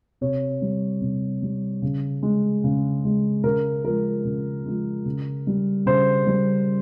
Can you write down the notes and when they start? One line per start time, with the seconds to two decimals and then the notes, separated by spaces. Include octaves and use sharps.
0.21 C3 C#5
0.62 G3
1.01 C3
1.42 G3
1.82 C#3
2.23 G#3
2.64 C#3
3.04 G#3
3.44 C#3 A#4
3.85 F3 G#3 A#4
4.25 C#3
4.65 F3 G#3
5.05 C#3
5.47 G3
5.86 C#3 C5
6.26 G3